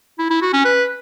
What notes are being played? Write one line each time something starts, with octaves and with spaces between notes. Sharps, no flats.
E4
E4
F#4
C#4
B4